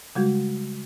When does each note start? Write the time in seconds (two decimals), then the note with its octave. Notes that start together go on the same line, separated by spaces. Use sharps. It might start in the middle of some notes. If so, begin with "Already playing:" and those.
0.15 C#3 G3 G#3 F#4